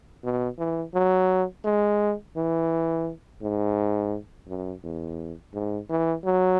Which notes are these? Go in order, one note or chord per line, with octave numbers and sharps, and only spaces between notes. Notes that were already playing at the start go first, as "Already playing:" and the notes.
B2
E3
F#3
G#3
E3
G#2
F#2
E2
G#2
E3
F#3